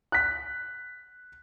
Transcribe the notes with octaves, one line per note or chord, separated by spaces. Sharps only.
F#6 B6